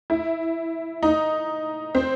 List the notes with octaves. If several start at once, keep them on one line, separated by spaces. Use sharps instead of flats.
E4
D#4
C4